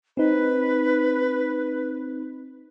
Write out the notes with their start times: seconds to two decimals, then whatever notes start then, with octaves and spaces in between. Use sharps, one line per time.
0.17 C4 D#4 B4